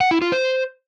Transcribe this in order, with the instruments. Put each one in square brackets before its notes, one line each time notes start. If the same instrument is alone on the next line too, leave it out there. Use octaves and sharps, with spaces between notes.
[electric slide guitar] F#5
E4
F4
C5